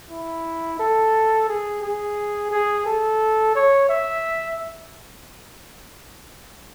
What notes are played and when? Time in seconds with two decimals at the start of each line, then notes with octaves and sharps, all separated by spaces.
0.10 E4
0.79 A4
1.48 G#4
1.82 G#4
2.51 G#4
2.86 A4
3.55 C#5
3.89 E5